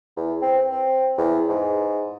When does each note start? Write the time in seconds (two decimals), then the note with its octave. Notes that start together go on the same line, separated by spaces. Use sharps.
0.17 E2
0.42 C4
0.71 C4
1.17 E2
1.49 G#2